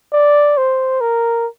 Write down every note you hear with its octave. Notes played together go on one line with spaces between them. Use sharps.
D5
C5
A#4